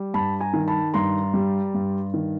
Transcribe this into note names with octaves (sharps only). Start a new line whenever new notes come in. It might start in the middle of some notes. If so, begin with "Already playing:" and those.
Already playing: G3
G2 A5 B5
G#5 A#5
D#3
A5 B5
G2 A#5 C6
G3
G2
D#3